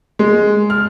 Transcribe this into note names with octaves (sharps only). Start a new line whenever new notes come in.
G#3
F6